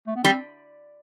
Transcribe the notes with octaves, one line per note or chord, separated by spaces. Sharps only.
A3
B3
G3 C4